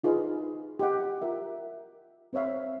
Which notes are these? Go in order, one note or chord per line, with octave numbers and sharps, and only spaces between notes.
D#4 F4 G#4 B4 D#5 F5
G4 D#5 F#5
F4 A#4 E5
C4 C5 C#5 E5 F5